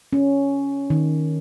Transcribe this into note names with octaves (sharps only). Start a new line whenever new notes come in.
C#4
D#3